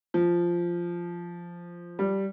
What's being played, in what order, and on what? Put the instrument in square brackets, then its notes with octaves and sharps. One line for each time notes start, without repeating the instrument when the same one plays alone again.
[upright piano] F3
G3